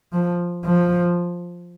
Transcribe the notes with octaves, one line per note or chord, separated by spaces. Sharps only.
F3
F3